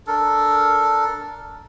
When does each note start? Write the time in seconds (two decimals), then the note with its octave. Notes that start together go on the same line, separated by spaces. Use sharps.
0.07 D4 A4 A#4